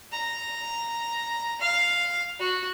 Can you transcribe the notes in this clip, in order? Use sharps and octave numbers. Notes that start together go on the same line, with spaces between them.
A#5
F5
F#4